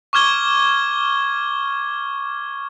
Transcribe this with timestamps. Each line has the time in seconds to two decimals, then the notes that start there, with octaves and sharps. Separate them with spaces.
0.13 C#6 D6 F6 G#6 G7